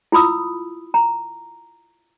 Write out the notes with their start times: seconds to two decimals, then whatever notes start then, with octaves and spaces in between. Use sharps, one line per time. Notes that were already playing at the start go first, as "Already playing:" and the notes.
0.12 E4 F4 B5 D#6 E6
0.94 A#5